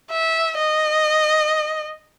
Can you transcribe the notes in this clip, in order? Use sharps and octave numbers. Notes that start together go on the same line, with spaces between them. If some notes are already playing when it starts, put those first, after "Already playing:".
E5
D#5